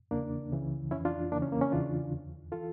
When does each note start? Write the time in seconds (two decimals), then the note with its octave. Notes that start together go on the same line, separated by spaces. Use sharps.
0.11 E2 C#3 E3 A#3 D4
0.52 C#2 C#3 E3
0.91 F2 E3 C#4 E4
1.05 D4 F4
1.32 E2 C#3 E3 A#3 D4
1.42 C#4
1.52 A#3
1.61 C#4
1.72 E2 C#3 E3 D4 F4
2.12 E2 D3
2.52 E3 F4 A4